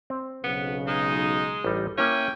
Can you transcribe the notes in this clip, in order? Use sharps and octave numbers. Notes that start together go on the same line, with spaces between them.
C4
B1 C#3 B3
G#3 D#4
A1 G3 D#4
A#3 C#4 E4 G5